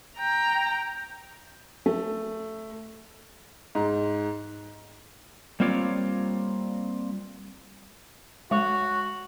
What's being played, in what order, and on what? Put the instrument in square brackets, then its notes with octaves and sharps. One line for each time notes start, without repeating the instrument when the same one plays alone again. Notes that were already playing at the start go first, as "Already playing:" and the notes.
[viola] G5 A#5
[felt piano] A3
[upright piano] G#2
[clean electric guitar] G3 A#3 C4 F4 C#5 D5
[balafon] G#3 [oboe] F#4 [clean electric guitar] C#5